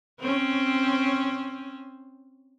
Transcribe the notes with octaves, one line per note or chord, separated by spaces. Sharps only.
C4 C#4